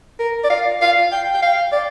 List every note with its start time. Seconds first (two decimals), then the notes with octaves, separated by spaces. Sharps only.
0.20 A#4
0.44 D5
0.50 F5
0.82 F5
1.12 G5
1.34 G5
1.43 F5
1.72 D5